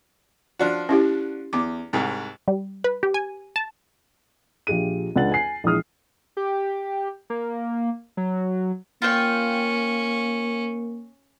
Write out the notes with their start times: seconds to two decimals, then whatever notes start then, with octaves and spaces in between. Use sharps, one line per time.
0.59 F3 D4 F#4
0.89 C#4 E4 G4
1.53 E2 D6
1.93 C2 G#2
2.48 G3
2.84 B4
3.03 G4
3.14 G#5
3.56 A5
4.67 A#1 F4 G4 G#4 D#7
5.16 C#2 D4 F#5 A6 F#7
5.32 G#5 C7
5.64 A#1 E3 G#3 D#6 F6
6.37 G4
7.30 A#3
8.17 F#3
9.02 A#3 C#4 F4 G5